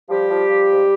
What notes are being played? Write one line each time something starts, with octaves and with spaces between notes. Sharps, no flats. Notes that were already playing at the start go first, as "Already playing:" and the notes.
F3 G3 G4
F3
F3
G#2